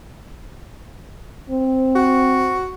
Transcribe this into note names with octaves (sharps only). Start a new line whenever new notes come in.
C4
F#4